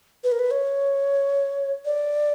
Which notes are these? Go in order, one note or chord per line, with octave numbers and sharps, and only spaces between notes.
B4
A#4
B4
C#5
D5